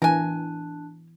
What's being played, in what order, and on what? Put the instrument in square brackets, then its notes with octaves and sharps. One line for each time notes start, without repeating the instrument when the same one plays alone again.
[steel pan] E3 [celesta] D4 A5 F#6 [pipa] A#4 G#5